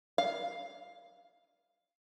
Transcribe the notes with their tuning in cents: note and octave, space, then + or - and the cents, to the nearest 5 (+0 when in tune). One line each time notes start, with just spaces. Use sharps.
F5 +5